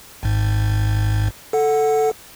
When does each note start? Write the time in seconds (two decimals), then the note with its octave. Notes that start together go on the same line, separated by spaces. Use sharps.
0.23 G#1 G#2
1.53 A4 F#5